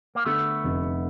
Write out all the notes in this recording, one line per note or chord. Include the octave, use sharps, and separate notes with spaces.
A#3
D3 A3 B3
F1